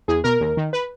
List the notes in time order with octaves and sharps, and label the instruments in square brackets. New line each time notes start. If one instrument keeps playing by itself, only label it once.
[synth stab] E2 G#4
B2 A#4
D#2
D#3
B4